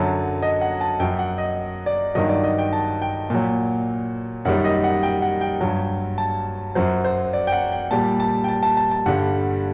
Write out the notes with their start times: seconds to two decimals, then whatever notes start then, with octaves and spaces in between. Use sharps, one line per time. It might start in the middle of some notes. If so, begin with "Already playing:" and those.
Already playing: F#2 D3 F#3 A5
0.42 D#5
0.61 F#5
0.81 A5
1.00 F#2 F#3 G5
1.19 F#5
1.38 D#5
1.86 D5
2.15 G2 D#3 F#3 D#5
2.29 D5
2.44 D#5
2.58 G5
2.73 A5
3.02 G5
3.30 A#2 F#3
4.45 F#2 D#3 G3 F#5
4.65 D#5
4.84 F#5
5.03 G5
5.22 F#5
5.41 G5
5.61 G2 F#3
6.18 A5
6.75 F#2 F#3 C5
7.05 C5
7.33 D5
7.47 G5
7.52 F#5
7.72 G5
7.91 A#2 G3 A5
8.20 A5
8.44 G5
8.48 A5
8.63 A5
8.77 A5
8.91 A5
9.06 G2 D3 G3 F#5